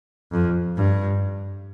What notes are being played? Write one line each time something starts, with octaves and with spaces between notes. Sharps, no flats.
F2
G2